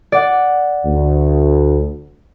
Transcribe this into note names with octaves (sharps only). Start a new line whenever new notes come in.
D5 F#5
D2